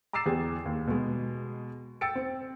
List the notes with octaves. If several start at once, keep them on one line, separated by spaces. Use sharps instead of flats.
A#5 D6 E6 A6 C7 E7
E2 G4 G#4
D#2
B2 G#3
G5 E6 A6 C#7 D7
C4